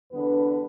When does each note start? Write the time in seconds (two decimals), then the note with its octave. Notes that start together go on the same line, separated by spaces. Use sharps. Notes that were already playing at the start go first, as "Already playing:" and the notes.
0.11 E2 D3 G3 B3 D4 B4